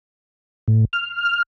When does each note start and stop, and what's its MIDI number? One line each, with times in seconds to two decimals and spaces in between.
0.68 0.85 45
0.93 1.42 89